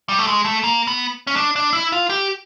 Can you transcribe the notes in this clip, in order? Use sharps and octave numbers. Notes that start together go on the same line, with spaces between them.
G3
A3
G#3
A3
A#3
B3
C#4
D4
D4
E4
F4
G4